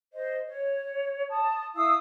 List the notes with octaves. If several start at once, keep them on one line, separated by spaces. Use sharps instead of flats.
C5 D#5
C#5
A5 D#6
E4 F5 D#6 E6